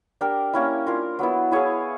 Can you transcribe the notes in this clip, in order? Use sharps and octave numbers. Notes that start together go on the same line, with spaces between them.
D4 G4 A#4
A#3 C#4 E4
D4 F4 A#4
F#3 B3 E4
E4 G#4 C#5 F5